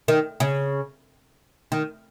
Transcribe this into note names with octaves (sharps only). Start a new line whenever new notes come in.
D#3
C#3
D#3